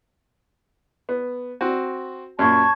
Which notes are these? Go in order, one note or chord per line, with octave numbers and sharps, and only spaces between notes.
B3
C4 F#4
F#2 A#2 A5 C#6 G#6